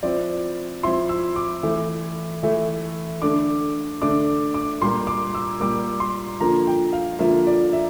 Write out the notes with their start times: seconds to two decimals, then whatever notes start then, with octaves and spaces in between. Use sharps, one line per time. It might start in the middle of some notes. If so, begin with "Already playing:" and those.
0.03 F3 C4 E4 D5
0.83 F3 C4 E4 C6
1.09 E6
1.36 D6
1.63 E3 A3 E4
2.43 E3 A3 E4
3.22 D3 A3 D4 D6
4.01 D3 A3 D4 D6
4.54 D6
4.81 A#2 G3 A#3 C6
5.07 D6
5.35 E6
5.60 A#2 G3 A#3 D6
6.00 C6
6.40 D3 F3 A#3 F4 A#5
6.67 G5
6.93 F5
7.19 D3 F3 A#3 F4 E5
7.47 D5
7.73 E5